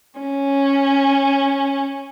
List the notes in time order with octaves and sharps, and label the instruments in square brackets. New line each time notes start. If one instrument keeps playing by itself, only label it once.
[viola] C#4